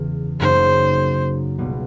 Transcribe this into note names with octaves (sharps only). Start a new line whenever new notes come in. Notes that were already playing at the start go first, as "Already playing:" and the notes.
Already playing: E2 C#3 E3
F#2 C#3 F#3 A#3 D#4 C5
C#2 B2 G3 B3